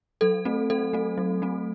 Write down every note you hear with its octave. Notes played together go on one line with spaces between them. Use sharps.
F#3 A4
A3 C4
F#3 A4
A3 C4
F#3
A3 C4